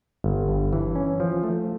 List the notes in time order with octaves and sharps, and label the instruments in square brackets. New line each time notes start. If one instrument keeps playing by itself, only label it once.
[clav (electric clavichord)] G1
G2
E3
C#4
F3
A3